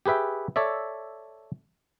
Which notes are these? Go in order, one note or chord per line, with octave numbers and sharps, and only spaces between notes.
G4 G#4 B4 E5 G5
A4 C#5 D5 E5